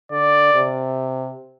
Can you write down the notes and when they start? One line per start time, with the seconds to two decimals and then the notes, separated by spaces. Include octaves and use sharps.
0.11 D3 D5
0.54 C3